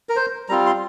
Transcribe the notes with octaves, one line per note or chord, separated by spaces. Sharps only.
A#4
C5
G3 C4 F4 A#5
C6